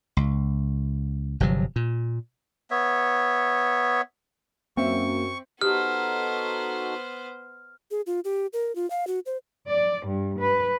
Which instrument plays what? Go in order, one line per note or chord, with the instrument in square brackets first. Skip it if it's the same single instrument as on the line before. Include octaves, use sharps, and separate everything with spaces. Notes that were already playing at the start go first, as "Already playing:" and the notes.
[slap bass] C#2
G1 C3 F3 F#3
A#2
[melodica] B3 C#5 E5
[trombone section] F#2 [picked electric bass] A#3 [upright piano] C4 E5 [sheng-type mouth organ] C#6
[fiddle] B3 C5 [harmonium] D#4 F#4 A4 [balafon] G4 [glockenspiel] F6
[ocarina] G#4
F4
G4
A#4
F4
F5
F#4
C5
[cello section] D5
G2
B4